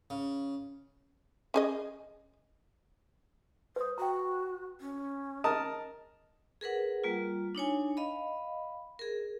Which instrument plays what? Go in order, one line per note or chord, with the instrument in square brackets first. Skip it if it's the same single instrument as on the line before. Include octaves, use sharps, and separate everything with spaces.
[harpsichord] C#3
[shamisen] C#4 G#4 D#5
[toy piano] B4 D#6 [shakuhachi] C5
[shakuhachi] F#4 [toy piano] G5 A#5
[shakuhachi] C#4
[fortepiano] A#4 A5 D#6 [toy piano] D#5
[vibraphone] G#4 A#4 B4 F#5
G3 A#3 F4
D4 D#4 C#5 G#5
D#5 F5 B5
G#4 A#4